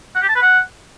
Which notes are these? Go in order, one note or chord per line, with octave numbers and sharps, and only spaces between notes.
F#5
G4
A5
B4
F#5